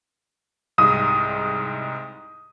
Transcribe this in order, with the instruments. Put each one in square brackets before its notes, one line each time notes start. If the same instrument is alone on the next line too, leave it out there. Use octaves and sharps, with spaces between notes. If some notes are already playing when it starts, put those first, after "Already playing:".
[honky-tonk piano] C2 G#2 D#6